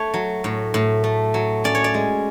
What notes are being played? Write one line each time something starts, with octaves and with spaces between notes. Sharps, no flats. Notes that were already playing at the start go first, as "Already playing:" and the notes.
Already playing: A3 C#5
F#3
A2
A2
A3
F#3
C#4 D5
C#5
D5
G#3